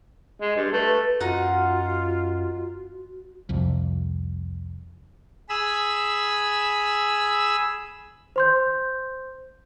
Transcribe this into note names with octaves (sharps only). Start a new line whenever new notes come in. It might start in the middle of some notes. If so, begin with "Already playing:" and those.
G#3
G2
A3 B4
F#2 D#4 F4 F#4 F#5
C2 F2
G#4 B5 E6
C5 C6 G6